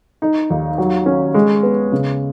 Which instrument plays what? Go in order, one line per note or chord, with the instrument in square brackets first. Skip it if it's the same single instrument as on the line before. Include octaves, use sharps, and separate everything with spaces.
[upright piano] D#4
D#2
F#3
C#4
G#3
B3
C#3